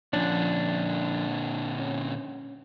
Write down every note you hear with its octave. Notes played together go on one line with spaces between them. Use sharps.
A#2 D3 F3 C#4 D4
C#4